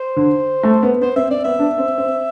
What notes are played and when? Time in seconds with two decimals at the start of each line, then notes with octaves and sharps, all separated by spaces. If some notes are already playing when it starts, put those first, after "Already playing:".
Already playing: C5
0.16 D3
0.63 A3
0.83 B3
1.02 B3 C5
1.16 C4 E5
1.31 C4 D5
1.44 B3 E5
1.59 D4
1.78 C4
1.98 C4